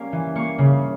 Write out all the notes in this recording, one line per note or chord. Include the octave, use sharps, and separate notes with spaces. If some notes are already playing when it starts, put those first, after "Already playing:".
Already playing: G3 A#3 C#4
E3
A#3 C#6
C#3